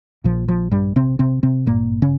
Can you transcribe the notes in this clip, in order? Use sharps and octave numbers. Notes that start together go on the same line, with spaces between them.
A#1 A#2 F3
F3
G2 G3
C3 C4
C3 C4
C3 C4
G#1 G2 A#2 A#3
C#3 C#4